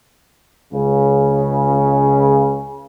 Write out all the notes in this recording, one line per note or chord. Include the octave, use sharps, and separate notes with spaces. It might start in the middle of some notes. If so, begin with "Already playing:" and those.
C#2 C#3